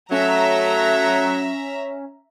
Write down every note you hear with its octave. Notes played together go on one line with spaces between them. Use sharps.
F#3 A3 C#4 E5 A#5